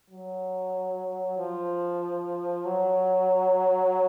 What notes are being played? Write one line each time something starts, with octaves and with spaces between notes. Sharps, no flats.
F#3
F3
F#3